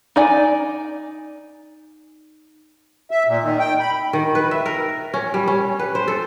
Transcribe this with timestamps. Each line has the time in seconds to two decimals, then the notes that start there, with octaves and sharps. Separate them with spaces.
0.16 D#4 D5 G#5
3.11 E5
3.27 A#2
3.42 D#3
3.59 G5
3.80 B5
4.13 D#3
4.35 B4
4.51 E5
4.66 A#4
5.14 C#4
5.34 G3
5.48 C#4
5.79 B4
5.95 C5
6.08 A4